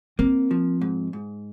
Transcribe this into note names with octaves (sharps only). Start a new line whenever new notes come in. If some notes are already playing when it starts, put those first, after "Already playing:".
A#3 C4
F3
G#2
G#2